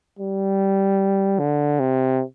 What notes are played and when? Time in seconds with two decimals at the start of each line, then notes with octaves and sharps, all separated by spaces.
0.19 G3
1.39 D3
1.80 C3